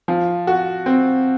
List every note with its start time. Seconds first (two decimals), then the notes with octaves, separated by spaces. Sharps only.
0.08 F3
0.47 F#4
0.86 C4